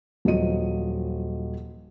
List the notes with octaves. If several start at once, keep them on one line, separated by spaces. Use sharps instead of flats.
D#1 F3 F#3 D#5 D#7